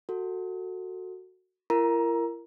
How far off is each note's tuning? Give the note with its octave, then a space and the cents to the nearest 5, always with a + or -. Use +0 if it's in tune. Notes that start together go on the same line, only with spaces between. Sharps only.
F#4 +0 A4 +25
E4 +45 A#4 -5 A#5 +20